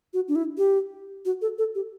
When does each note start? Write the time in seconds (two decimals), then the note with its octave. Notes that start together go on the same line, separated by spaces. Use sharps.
0.14 F#4
0.28 D4
0.36 E4
0.58 G4
1.25 F#4
1.42 A4
1.58 A4
1.75 G4